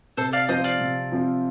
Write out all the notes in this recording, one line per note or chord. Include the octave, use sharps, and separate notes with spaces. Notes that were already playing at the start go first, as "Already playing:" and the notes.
C3 A4 C5
D5 F5
F3 C4 F4 C5 D#5
D5 F5
C3
F3 C4 F4